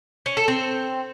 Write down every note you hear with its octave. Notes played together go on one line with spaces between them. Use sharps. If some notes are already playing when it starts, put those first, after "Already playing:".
C#4
A4
C4